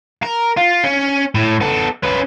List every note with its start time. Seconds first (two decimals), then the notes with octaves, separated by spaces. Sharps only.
0.23 A#4
0.57 F4
0.84 C#4
1.35 A2
1.61 B3 A4
2.03 C#4 B4